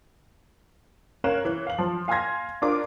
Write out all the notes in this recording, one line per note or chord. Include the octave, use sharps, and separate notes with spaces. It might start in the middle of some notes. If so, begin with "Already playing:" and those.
C#4 A#4 C#5 F5 F#6 E7
E3 C#5
F5 F#7
F3
F5 G#5 C6 F6 G#6 A#6
D4 F4 A#4 D5 D6